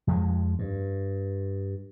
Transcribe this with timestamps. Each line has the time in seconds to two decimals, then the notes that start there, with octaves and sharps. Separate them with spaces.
0.07 F2 F3 G#3
0.59 G2